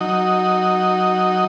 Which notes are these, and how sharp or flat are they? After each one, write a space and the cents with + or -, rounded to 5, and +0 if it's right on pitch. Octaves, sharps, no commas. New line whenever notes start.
F#3 +0 D#4 +0